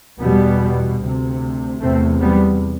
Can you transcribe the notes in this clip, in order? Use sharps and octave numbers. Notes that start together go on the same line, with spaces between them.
E2 B2 G3 B3
D2 C3
E2 C3 A3 C4
G3 B3